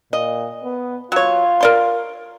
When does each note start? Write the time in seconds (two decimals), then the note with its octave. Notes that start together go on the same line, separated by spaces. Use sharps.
0.13 A#2 D#5
0.64 B3
1.12 F#3 F4 C#5
1.61 A#4 D5 C6